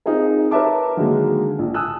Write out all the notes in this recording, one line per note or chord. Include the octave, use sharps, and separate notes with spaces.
C4 D#4 F4 G#4 A#4
A#4 B4 C#5 E5 A5 D6
D3 D#3 F#3 G#3 A#3
A#1
G#5 A5 D#6 E6 F#6